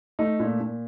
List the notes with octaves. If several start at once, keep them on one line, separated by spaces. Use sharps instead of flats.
A3 D#4
A#2
A#2